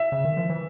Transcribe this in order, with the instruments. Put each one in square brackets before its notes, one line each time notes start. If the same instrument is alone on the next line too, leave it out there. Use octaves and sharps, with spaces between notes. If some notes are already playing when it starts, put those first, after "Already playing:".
Already playing: [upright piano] E5
[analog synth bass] C#3
D#3
F3
E3